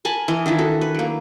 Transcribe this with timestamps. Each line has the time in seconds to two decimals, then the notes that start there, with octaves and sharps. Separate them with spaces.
0.05 A#4 G#5 A5 B5
0.28 E3 A#4 D#5
0.46 D#3 D4 E4 F4
0.58 F#4 A4
0.81 B4
0.95 F#3 A#3